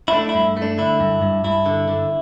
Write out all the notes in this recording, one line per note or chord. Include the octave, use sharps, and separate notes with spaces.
E4
A3 D4
E4
G2
A3
D4
D3 E4
G2
G2
G2 E4
D3
D3